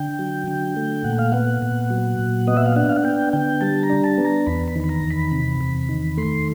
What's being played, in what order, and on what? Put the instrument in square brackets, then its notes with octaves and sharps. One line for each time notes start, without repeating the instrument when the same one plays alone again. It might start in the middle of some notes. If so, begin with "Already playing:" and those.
Already playing: [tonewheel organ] D3 G5
F#3
D3
A3
A#2 F#5
F5
B3 F#5
A#2
F#3
A#2
B3 D#5
E5
F5
D4 F#5
F5
F#5
B3 G5
D3 G5
G3 A5
A#5
D4
A5
B3
A#5
E2 B5
B5
D#3
B5
A#5
E2
B5
C3
E2
D#3
A3 C6